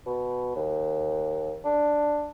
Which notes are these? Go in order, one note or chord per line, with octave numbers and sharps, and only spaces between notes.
B2
D#2
D4